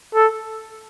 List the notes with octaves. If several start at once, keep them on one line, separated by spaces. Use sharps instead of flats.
A4